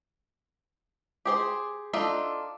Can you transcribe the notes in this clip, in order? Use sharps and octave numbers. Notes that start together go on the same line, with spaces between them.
G4 G#4 C5
D4 D#4 F4 A4 E5